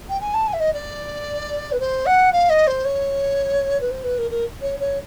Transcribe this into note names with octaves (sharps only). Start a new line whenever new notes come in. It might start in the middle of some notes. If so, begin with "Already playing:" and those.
G5
G#5
A5
G#5
E5
D#5
D5
B4
C5
F#5
F5
D#5
C5
C#5
B4
C5
B4
A#4
A#4
C#5
C#5